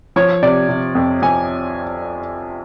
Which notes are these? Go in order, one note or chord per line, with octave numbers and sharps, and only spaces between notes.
F3 C#5
C3 D5
C3
F2
F2 G#5